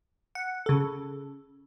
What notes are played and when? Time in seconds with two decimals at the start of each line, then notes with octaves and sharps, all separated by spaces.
0.35 F#5
0.66 C#3 A4